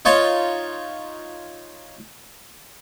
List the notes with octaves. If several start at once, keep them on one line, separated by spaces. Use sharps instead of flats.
D#4 F4 C#5 A5